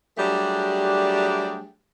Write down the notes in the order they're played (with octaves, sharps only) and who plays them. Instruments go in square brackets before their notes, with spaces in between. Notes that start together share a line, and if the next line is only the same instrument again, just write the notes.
[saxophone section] F#3 G3 A3 D4 G4 G#4